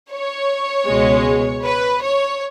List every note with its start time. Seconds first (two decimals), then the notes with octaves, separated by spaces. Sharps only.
0.11 C#5
0.87 C#2 B2 G#3
1.64 B4
2.02 C#5